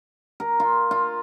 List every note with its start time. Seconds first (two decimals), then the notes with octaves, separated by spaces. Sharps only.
0.40 A#4
0.60 F4
0.91 F4